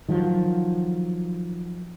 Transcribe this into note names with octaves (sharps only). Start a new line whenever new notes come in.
D#3 F3 F#3